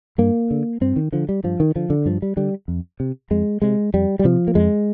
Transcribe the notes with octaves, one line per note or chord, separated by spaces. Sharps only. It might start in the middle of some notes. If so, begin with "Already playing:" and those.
G2 A#3
D3
G2 C4
D#3
D3 F3
G3
G2 F3
D#3
D3 F3
D3
G2 F3
G3
D3 G3
F2
C3
F2 G#3
C3 G#3
F2 G3
G3
C3 F3
A#3
F2 G#3